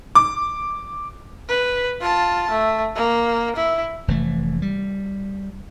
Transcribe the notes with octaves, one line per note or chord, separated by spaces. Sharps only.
D6
B4
F4 A5
A3
A#3
E4
F1 E3 A3
G3